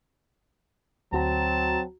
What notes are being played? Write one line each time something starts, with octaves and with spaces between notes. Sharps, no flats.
D2 F#3 C4 F#4 A5 A#5